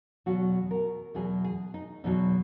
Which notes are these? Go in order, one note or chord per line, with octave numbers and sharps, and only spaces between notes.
E2 B2 F#3 F#4
A#4
E2 B2 F#3 G#4
G#4
D#4
E2 B2 F#3 D#4